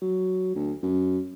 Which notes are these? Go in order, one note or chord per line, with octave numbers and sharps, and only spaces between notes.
F#3
D2
F#2